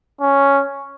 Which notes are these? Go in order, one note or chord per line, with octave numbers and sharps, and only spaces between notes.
C#4